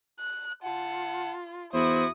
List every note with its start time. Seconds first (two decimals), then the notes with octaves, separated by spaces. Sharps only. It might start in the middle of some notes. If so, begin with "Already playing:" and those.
0.19 F#6
0.64 F4 F#5 A5
1.73 E2 E4 F#4 C5 D#6